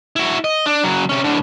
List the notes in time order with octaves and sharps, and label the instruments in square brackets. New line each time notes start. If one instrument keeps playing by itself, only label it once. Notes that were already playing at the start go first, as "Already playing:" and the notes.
[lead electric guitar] E4 F#4
D#5
D4
C#3 F#3
C3 C#4
A2 D3